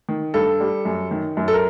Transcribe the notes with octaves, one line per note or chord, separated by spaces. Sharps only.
D#3
G2 A4
G3
F#2
D#3
F#2
A4
A#4